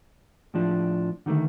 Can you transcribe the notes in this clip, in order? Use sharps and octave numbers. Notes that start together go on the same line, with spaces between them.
A2 F3 D4
D3 D#3 G#3 A3